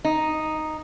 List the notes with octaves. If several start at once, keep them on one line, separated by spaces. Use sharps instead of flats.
D#4